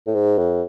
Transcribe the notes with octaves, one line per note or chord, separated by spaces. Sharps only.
A2
G#2
F2